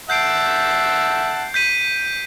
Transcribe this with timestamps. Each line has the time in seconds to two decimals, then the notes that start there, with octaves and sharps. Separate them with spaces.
0.10 E5 F#5 A5 G6 C7 D7
1.54 G6 B6 D#7